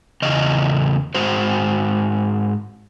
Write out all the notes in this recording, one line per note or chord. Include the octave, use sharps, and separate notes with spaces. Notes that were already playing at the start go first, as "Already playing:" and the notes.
E2 C#3 D#5
G#2 F#4 C5